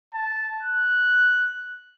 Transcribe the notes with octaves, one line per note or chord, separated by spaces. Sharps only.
A5
F#6